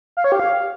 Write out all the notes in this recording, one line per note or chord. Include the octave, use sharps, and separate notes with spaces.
F5
C#5
G4
F5